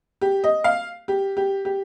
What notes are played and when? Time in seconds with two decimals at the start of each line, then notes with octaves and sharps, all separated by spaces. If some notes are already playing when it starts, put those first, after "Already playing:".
0.21 G4
0.44 D#5
0.64 F5
1.08 G4
1.37 G4
1.65 G4